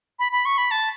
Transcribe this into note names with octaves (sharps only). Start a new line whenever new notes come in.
B5
B5
C#6
B5
A5